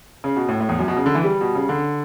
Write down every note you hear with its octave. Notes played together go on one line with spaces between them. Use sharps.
C#3
B2
A2
A2
E2
F#2
B2
C#3
D3
E3
G3
B2
C#3
D3